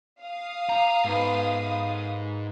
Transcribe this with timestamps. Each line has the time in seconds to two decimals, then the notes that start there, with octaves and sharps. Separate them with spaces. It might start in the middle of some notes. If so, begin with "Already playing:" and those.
0.21 F5 D#6
0.69 G4 A#5
1.04 G#2 B2 A4 B4
1.51 A#4 B4